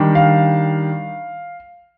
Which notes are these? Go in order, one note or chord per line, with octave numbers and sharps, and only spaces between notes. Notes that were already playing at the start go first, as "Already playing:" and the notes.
Already playing: D#3 G3 D4
F5